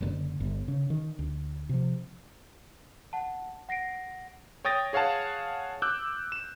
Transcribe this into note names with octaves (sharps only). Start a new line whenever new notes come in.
F#1 A2 D3
G1
C#3
D#3
D2
C3 F3
F#5 A5
F#5 A#6 C7 D7
C#5 G5 D#6 A6 A#6
G#4 C#5 F5 F#5 A5
D6 E6 F#6 G6
E7